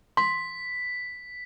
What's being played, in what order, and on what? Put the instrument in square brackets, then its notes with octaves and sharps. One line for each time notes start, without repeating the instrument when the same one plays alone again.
[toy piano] C6 [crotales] B6